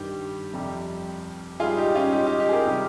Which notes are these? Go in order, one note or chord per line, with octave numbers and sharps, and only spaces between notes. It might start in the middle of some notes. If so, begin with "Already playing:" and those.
Already playing: G2 D#3 G3 G4
F2 C3 G3
G#2 G3 F4 G#4
D#4 G4
C#4 F4
D#4 G4
D#4 G4
D#4 G4
G#4
G4 A#4
C3 D#3 G3